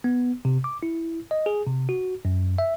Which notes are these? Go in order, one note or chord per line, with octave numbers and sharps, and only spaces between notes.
B3
C3
D6
E4
D#5
G#4
C3
F#4
F#2
E5